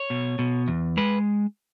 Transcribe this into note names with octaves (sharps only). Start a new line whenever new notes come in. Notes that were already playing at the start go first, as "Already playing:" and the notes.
Already playing: C#5
B2
B2
E2
G#3 B4